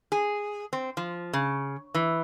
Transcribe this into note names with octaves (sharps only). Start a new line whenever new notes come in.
G#4
C4
F3
C#3
E3